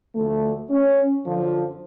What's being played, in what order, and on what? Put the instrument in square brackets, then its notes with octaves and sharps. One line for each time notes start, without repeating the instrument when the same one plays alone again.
[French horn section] D2 D3 F3 A3
C#4
F#2 D3 F3